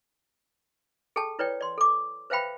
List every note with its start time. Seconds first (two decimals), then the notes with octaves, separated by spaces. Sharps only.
1.16 G#4 A4 G5 A5
1.39 E4 B4 C#5 D5 G5
1.61 D5 C6
1.78 A4 D6
2.30 B4 C5 E5 F5 G5 B5